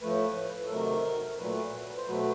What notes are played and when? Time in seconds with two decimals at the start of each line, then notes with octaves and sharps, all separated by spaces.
0.02 A2 F3 A3 B4
0.66 A4
0.70 C3 D#3 F#3 A3 A#4
1.39 A#2 F#3 A3 B4
1.97 C5
2.06 B2 F#3 A3 B4